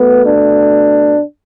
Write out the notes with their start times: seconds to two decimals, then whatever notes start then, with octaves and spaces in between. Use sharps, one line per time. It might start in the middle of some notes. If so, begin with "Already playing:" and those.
Already playing: B2 A3 B3
0.26 D4